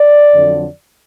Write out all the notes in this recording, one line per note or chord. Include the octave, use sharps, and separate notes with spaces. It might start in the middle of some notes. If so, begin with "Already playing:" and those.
Already playing: D5
F2 D3 F#3